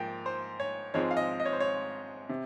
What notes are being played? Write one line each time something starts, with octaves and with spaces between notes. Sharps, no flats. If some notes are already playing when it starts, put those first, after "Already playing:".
Already playing: G#2 F3 A#3 G5
C5
C#5
G#2 F3 G#3 C4 C#5
F5
D#5
D#5
C#5
C5
C#5
C3